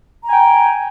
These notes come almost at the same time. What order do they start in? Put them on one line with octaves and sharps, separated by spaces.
A#5 G#5 G5